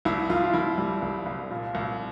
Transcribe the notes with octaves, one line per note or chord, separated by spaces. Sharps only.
C2 E4
C2 F4
F4
C2 E4
G3
C2
C2
A#2
C2